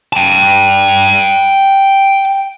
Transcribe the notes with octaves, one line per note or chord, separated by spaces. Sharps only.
G5 A5